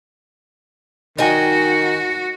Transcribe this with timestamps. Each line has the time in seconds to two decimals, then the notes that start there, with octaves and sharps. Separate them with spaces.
1.18 D#3 F#4 D#5 G5 G#5